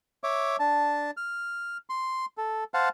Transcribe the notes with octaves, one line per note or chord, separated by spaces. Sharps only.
C#5 E5 D6
D4 A5
F6
C6
A4
C5 F5 F#5 A5